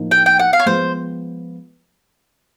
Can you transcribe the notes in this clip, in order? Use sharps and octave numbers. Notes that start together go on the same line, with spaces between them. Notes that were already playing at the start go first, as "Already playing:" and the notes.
Already playing: A2 F3 A#3 D#4
G5
G5
F#5
F5
C#5
F3 G#3 B3 C5